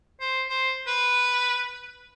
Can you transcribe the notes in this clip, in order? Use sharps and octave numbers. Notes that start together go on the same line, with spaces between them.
C5
C5
B4